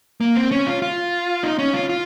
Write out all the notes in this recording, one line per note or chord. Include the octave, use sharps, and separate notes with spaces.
A#3
C4
C#4
F4
F4
D#4
C#4
F4
F4